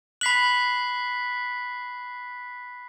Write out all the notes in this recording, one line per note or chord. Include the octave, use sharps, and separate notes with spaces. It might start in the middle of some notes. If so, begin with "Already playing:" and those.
B5 F#6 B6 C7 F#7